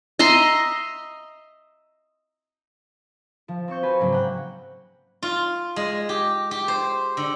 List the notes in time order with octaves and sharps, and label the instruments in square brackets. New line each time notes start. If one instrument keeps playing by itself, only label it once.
[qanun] D#5 E5 A#5 C6
[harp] F3
C4 C5 C#6 G6
F#4 B4 G#5
G#2 C#3 F#3 A#3
F#5 G5
[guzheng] F4
G#3
G4
G4
C5
D3